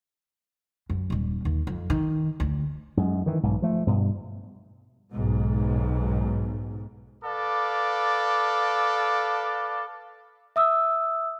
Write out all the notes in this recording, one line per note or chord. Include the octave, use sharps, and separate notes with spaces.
F#2
D#1 G3
D#2
F2
D#3
D2
F#2 G#3
D#3 E3
B1 G#2
F3 A3
G2 B2
B1 G#2
A4 B4 D5 F5 D6
E5 D#6 E6